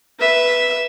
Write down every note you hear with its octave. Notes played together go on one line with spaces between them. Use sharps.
B4 E5